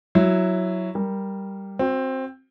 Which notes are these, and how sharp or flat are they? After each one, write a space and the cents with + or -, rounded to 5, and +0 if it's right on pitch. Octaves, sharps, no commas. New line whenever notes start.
F#3 +0 E4 +0
G3 +0 A#4 +0
C4 +10 F#4 -35